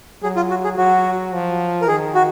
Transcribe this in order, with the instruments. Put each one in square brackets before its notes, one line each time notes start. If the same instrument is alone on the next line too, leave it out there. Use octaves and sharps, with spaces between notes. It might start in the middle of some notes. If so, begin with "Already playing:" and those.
[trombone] F#3 [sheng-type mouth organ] G#4
[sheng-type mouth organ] F4
F#4
G#4
[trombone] F#3 [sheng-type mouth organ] F#4
[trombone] F3
[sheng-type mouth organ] A#4
[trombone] D#3 [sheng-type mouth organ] G#4
[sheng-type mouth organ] F#4